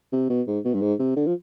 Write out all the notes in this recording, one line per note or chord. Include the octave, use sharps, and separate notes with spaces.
C3
B2
G#2
B2
G2
G#2
C3
D3
F3